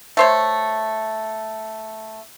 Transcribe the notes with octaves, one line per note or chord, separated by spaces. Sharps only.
A3 C5 C#5